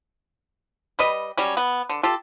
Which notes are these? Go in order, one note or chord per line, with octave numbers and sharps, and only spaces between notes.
G3 B4 D#5
F#3 G3 C#4
B3
D3
F4 G4 A4